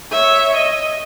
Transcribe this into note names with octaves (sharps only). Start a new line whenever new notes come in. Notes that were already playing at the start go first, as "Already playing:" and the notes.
C#5 E5
D#5